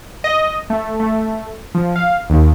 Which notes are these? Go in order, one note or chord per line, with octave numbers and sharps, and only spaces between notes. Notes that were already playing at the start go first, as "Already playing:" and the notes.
D#5
A3
A3
F3
F5
D#2